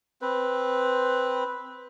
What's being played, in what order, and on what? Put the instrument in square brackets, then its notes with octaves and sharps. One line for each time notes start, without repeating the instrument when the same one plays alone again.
[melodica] C4 B4